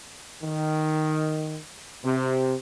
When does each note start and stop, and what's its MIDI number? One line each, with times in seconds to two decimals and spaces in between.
0.42 1.57 51
2.03 2.53 48